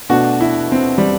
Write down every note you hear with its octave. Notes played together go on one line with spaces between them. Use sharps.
B2 A3 D4 F#4
E4
C4
G3